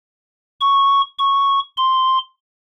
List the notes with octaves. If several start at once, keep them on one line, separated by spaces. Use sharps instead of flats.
C#6
C#6
C6